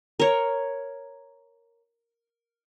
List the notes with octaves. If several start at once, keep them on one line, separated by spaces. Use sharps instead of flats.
A#4 C#5